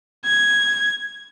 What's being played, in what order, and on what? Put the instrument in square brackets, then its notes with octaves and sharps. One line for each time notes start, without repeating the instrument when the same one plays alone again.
[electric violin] G#6